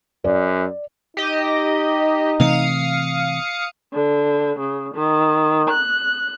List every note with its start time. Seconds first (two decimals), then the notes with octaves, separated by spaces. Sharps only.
0.24 F#2 D5
1.17 D#4 G4 D#5
2.40 C3 E3 A3 F5 D#6 C#7
3.93 D3
4.59 C#3
4.94 D#3
5.70 F#6